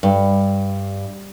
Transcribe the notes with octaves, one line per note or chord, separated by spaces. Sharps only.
G2